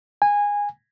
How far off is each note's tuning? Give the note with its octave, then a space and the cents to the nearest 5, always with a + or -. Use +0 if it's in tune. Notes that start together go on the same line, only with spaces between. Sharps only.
G#5 -15